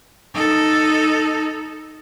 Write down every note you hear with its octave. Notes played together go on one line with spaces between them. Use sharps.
D#4 A4